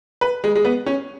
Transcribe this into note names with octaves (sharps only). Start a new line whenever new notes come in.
B4
G#3
G#3
B3
C#4